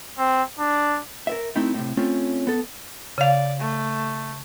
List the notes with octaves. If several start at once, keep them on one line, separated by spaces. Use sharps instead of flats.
C4
D4
A#4 B4 E5
A3 C4 D#4 E4
A2 C3
A3 C4 C#4 F4
B3 A4
C#3 D5 F5
A3